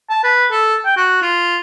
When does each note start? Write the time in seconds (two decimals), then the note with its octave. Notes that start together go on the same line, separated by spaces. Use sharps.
0.10 A5
0.24 B4
0.51 A4
0.86 G5
0.97 F#4
1.22 F4